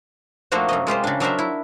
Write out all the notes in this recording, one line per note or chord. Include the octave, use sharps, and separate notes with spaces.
F3 A3 A#3 D4 F#4 C5
F#2 C3 D#5
G#3 F4 G4 C5
C#3 D4
F#3 D4 A#4 C5 E5
E4